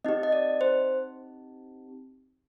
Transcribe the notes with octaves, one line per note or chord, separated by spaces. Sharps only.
C4 D#4 G4 D#5
D#5
D5
C5